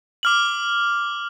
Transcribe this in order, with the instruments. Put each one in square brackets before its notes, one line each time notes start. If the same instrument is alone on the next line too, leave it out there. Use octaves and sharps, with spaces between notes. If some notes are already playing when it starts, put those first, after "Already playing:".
[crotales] D6 F6 F#7